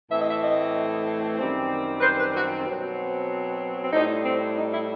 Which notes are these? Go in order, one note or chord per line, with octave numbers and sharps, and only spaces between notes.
A2 E3 A3 C4 E5
D#5
E5
D#5
F#2 D#3 G3 C4
B4
C5
B4
F#4
B2 F#3 C4
C4
A2 G3 C4 D#4
C4
D#4
E4